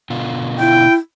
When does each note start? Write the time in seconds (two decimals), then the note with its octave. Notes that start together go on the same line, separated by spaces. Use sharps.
0.10 B2 D3 F4
0.60 E4 G5